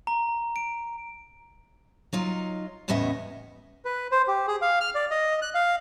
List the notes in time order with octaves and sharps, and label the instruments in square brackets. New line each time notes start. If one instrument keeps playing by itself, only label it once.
[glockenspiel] A#5
D7
[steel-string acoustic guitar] F#3 D#4 F4
E2 A2 C#3 B3 D#5 E5
[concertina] B4
C5
G4
G#4
F5
F6
D5
D#5
F#6
F5